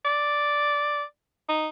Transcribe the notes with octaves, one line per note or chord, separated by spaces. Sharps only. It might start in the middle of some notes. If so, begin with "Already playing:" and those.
D5
D#4